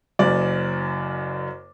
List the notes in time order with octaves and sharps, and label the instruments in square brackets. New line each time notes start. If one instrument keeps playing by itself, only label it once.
[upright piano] F#1 F#2 D5